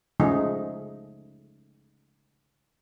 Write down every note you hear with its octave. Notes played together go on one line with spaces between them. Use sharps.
C#3 F3 G#3 A3 D#4 G#4